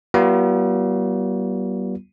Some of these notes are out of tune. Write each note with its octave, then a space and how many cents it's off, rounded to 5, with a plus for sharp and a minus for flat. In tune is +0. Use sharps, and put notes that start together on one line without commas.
G3 -45 B3 -40 F4 -25